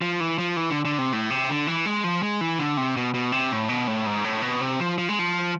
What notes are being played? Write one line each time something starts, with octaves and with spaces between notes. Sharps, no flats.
F3
E3
F3
E3
D3
D3
C3
A2
C3
D3
E3
G#3
F3
G#3
E3
D3
C3
B2
B2
C3
A2
B2
A2
G#2
A2
B2
C3
F3
F3
G#3
F3